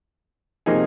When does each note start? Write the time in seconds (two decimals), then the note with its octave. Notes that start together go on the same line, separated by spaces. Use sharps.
0.66 C3 F3 A#3 D#4 G#4